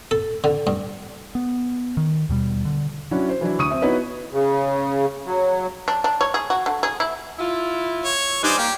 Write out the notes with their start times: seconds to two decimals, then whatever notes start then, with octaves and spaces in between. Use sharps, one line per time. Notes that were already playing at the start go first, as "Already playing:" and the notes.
0.11 A4
0.44 D3
0.67 G2
1.35 B3
1.97 D#3
2.29 D#2 B2 G3
2.65 D3
3.11 F#3 C#4 D4 E4 F#4
3.29 C5
3.41 E3 F#3 D4 E4
3.59 D2 C#6 D#6 D#7
3.70 C4 E5
3.82 B3 D#4 E4 F#4 B4 C#5
4.33 C#3
5.26 F#3
5.88 D4
6.04 D4
6.21 C#5
6.34 G#4
6.50 F#4
6.66 D3
6.83 G#4
7.00 E4
7.39 E4 F4
8.05 C#5
8.44 G2 D#4 C5 D5 G#5
8.58 A#3 G4